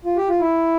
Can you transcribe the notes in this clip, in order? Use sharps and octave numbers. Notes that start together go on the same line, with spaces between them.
F4
G4
F4
E4